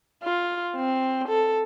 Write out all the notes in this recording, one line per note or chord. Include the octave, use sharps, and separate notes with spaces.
F4
C4
A4